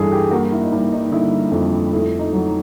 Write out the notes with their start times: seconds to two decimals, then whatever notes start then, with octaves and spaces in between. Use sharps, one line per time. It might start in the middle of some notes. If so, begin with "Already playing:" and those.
Already playing: G2 E3 G3 G#4 A4
0.12 G4
0.31 A#3 F#4
0.52 E4
0.64 D#4
0.72 G3 E4
0.92 D#4
1.12 D3 E4
1.52 F2
1.93 A3 E4
2.19 D#4
2.33 F#3